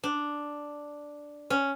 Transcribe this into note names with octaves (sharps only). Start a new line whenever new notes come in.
D4
C#4